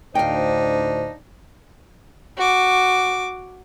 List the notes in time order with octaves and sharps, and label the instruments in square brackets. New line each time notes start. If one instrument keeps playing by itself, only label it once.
[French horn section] D2 A2 C5 [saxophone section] D4 D#4 [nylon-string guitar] F5 G5
[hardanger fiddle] F#4 D6